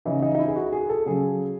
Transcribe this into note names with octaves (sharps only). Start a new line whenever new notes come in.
C#3 E3 D#4
D#4
D#4
E4
G#4
F#4
G#4
A4
C#3 F#3 G#4